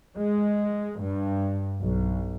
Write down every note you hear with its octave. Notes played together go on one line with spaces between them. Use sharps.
G#3
G2
B1